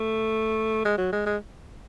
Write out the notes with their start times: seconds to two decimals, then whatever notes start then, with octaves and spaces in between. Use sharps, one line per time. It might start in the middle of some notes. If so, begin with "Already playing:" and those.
Already playing: A3
0.85 G#3
0.98 F#3
1.12 G#3
1.26 G#3